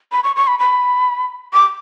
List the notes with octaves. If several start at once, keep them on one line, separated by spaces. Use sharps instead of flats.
B5
C#6
C#6
B5
B5
D6